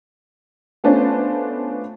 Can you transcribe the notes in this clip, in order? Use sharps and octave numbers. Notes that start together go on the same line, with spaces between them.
A3 B3 C#4 D4 F4 C5